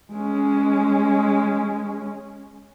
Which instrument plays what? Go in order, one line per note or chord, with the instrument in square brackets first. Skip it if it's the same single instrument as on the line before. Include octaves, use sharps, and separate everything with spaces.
[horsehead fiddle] G#3 C#4